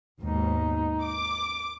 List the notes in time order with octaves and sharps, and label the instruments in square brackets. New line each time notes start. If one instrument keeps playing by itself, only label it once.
[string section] D#2 G#2 B2 [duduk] D#4
[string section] D6